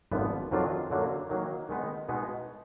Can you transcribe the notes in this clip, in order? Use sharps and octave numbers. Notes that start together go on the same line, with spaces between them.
G#1 F#2 D3 F3 B3
F2 D#3 F#3 D4 F4
F#2 D3 F#3 A#3
D#3 F#3 A#3
D#3 G#3 B3 D#4
B2 G#3 B3 D#4